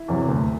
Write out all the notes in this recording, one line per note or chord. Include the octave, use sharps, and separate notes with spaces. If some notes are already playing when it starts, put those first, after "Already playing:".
Already playing: E4
E2 C3 F#3
D2